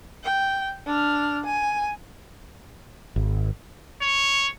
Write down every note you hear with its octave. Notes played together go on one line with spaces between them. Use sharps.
G5
D4 F6
G#5
G#1
C#5